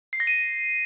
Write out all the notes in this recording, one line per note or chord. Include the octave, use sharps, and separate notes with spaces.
C7
A#6
D#7